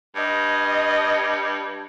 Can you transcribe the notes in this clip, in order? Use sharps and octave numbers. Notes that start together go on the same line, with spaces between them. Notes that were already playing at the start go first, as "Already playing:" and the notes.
G2 D#5